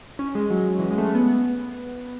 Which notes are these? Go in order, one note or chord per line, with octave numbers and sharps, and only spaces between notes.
C#4
G#3
F#3
E3
G#3
A3
G#3
B3